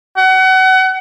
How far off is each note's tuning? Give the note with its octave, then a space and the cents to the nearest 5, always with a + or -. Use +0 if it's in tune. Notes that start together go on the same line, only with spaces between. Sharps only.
F#5 +30